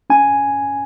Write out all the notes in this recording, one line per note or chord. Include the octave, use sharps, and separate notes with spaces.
C#4 G#5